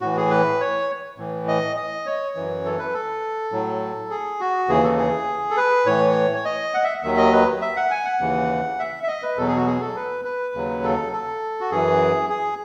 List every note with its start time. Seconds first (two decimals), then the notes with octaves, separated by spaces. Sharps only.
0.01 A2 E3 F#4
0.16 G#4
0.31 B4
0.60 C#5
1.18 A2 E3
1.48 D#5
1.76 D#5
2.06 C#5
2.36 F#2 E3
2.65 A4
2.79 B4
2.94 A4
3.52 A2 F#3
4.10 G#4
4.40 F#4
4.69 D#2 C#3 E3 G#4
4.84 A4
4.98 G#4
5.50 A4
5.57 B4
5.86 A2 E3 C#5
6.34 C#5
6.45 D#5
6.74 F#5
6.84 E5
7.03 D#2 D#3 F#3 E5
7.18 D#5
7.33 B4
7.62 E5
7.76 F#5
7.91 G#5
8.05 F#5
8.20 D#2 C#3 E3
8.79 E5
9.03 E5
9.08 D#5
9.23 B4
9.37 E2 B2 F#3 A4
9.48 G#4
9.56 F#4
9.66 G#4
9.81 A4
9.96 B4
10.25 B4
10.55 D#2 C#3 F#3
10.84 A4
11.13 A4
11.61 F#4
11.71 F#2 E3 G#4
12.30 G#4